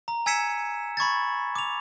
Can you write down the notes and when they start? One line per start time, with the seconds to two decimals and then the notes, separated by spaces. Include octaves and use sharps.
0.08 A#5
0.26 G#5 E6 G#6 B6 C#7 E7
0.97 B5 C#6 G#6 A6
1.55 D6 F7